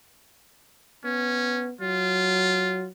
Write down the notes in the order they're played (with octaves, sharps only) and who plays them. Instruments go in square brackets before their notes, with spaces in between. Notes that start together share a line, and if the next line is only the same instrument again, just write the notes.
[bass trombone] B3 [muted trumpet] C#4
[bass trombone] F#3 [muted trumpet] F4